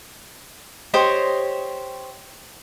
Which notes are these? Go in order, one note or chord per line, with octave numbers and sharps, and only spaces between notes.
G4 C5 C#5 D#5